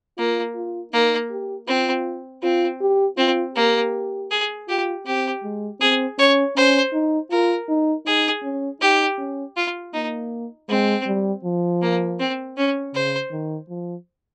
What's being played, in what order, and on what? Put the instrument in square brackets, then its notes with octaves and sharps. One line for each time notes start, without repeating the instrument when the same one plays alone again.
[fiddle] A#3 [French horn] F4
[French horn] F4
[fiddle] A#3 [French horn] D#4
[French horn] G4
[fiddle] C4 [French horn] F4
[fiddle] C4 [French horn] F4
[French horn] G4
[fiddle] C4 [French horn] F4
[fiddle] A#3 [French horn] G4
[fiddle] G#4
[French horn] F4 [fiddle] G4
[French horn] C4 [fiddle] G4
[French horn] G#3
[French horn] C4 [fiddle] G#4
[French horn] C#4 [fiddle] C#5
[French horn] C#4 [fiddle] C5
[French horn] D#4
[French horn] F4 [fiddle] A#4
[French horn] D#4
[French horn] D#4 [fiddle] G#4
[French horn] C#4
[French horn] D#4 [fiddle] G4
[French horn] C#4
[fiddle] F4
[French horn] A#3 [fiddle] D#4
[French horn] G#3 [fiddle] C4
[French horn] G3
F3
[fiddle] A#3
C4
C#4
[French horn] C#3 [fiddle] C5
[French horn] D#3
F3